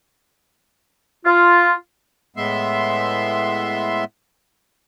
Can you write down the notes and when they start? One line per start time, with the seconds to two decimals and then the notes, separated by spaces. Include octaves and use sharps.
1.25 F4
2.37 A2 G#3 B3 E5 C6